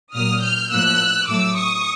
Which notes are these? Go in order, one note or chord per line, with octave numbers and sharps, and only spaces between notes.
A#2 F#3 A#3 D#6 F6
F6 G6
A2 F3 A#3 E6 F#6
A2 F#3 A3 D6 E6
C#6 D#6